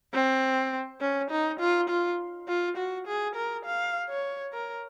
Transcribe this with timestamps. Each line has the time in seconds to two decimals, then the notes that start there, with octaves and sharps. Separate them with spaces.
0.14 C4
1.01 C#4
1.31 D#4
1.60 F4
1.89 F4
2.48 F4
2.77 F#4
3.07 G#4
3.36 A#4
3.66 F5
4.09 C#5
4.53 A#4